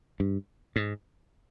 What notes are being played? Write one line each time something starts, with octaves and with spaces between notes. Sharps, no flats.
G2
G#2